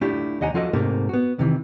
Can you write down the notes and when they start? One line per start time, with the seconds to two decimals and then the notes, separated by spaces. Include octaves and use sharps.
0.01 A3 D4 E4 F4 G4
0.41 D#2 D#5 F#5 G#5 A#5
0.54 F3 F4 F#4 A4 D#5
0.73 G#2 C3 A3 A#3
1.09 B3 F#4
1.39 C3 D#3 E3